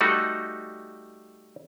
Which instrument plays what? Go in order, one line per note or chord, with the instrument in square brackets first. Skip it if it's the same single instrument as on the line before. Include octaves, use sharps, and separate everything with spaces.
[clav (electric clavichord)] G3 A3 D#4 F#4